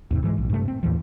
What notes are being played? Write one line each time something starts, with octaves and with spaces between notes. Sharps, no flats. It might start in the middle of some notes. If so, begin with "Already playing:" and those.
D#2 G#2 C3
G#2 E3 G3 G#3
A#1
G2 C3 A3
C4
D#2 A2 E3 F3